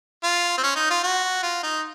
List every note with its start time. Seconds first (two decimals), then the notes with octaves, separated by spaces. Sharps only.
0.24 F4
0.58 C4
0.63 C#4
0.76 D#4
0.90 F4
1.03 F#4
1.43 F4
1.63 D#4